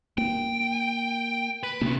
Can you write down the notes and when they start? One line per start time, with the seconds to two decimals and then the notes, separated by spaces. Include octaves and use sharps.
0.18 A#3 G5
1.63 B4
1.81 C3 A#3 B3 C#4